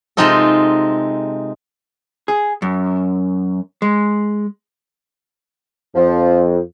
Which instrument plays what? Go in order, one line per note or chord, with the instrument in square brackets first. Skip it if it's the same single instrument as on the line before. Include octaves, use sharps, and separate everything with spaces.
[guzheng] C3 G#3 C4 D#4 F4 A4
[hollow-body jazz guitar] G#4
F#2
G#3
[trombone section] F2 [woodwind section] F3